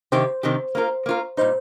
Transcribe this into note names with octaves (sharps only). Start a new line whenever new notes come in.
C3 D#3 C4 G4 C5
C3 D#3 C4 G4
A#3 F4 A#4
A#3 F4 A#4
A#2 G3 D#4 C5